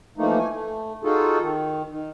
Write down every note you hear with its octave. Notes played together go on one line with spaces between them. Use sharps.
E3 F3 A3 A#3 D#4
G#5
A3
D#4 F4 F#4 G#4 A4
D#3
D#3